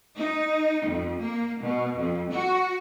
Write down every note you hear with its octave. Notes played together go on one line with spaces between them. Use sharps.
D#4
F2
A#3
B2
F2
F#4